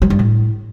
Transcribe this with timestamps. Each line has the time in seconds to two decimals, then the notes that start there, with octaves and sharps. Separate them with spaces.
0.02 F#3
0.10 G2
0.19 A2